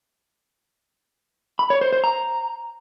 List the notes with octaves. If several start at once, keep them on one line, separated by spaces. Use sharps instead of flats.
B5
C#5
C5
C5
A#5